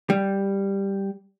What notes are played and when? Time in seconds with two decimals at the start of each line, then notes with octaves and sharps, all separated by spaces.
0.10 G3